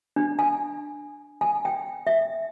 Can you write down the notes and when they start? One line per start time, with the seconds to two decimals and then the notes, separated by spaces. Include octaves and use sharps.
0.16 D4
0.39 G#5
1.41 G#5
1.65 G5
2.07 E5